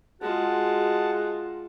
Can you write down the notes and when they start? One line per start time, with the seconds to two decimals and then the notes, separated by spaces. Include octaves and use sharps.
0.22 G#3 F4 F#4 G#4 F#5 A5